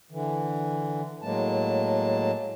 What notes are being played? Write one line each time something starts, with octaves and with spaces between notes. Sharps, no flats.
D3 E3
A2 F#3 G#3 A#3 A5